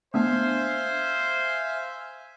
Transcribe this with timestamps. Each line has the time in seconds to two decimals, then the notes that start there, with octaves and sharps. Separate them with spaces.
0.14 A3 B3 D4 C5 E5 F5 G#5